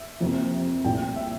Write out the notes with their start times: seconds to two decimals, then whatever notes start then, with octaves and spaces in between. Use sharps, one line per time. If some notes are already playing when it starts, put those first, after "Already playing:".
Already playing: E5
0.21 F2 C3 E3 A#3
0.84 C2 A#2 A3 E4 G5
1.16 E5